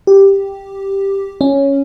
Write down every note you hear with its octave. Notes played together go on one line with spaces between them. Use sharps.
G4
C#4